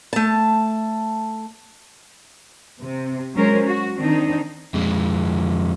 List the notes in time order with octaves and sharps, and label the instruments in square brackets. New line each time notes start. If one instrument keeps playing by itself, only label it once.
[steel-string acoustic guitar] A3 A5
[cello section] C3
F#3 G#3 C#4 A#4 C5
F#4
D#3 C4 D4 D#4
[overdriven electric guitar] F2 G#3